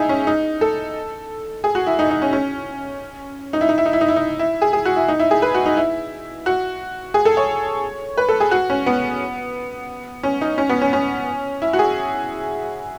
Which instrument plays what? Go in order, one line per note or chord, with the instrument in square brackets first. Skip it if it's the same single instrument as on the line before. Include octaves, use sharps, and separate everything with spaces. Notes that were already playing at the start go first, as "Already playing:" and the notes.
Already playing: [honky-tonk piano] D#4 E4 G#4
C#4
D#4
A4
G#4
F#4
E4
D#4
D#4
C#4
C#4
D#4
E4
D#4
E4
D#4
E4
D#4
E4
D#4
E4
G#4
G#4
F#4
E4
D#4
E4
G#4
B4
F#4
D#4
E4
F#4
G#4
A4
C#5
B4
A4
G#4
F#4
C#4
B3
C#4
D#4
C#4
B3
C#4
C#4
E4
F#4
G#4